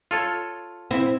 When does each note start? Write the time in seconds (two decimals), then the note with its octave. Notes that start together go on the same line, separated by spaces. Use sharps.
0.11 F4 A4 C#5
0.91 C4 E4